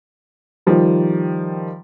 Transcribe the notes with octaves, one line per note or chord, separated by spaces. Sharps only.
D#3 F3 G3